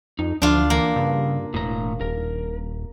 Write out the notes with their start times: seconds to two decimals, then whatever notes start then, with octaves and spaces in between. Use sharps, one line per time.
0.19 F2 D#4
0.42 D2 F3 D4 F4
0.70 E3 A#3
0.96 G2 C#3
1.54 E1 A2 A#5
2.01 D#1 A#4